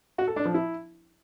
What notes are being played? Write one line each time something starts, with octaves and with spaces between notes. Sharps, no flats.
F#4
A4
D4
F3
E4